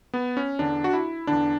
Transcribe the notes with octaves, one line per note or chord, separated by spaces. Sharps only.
B3
C#4
E2 D3 D4
F#4
E4
E2 D3 D4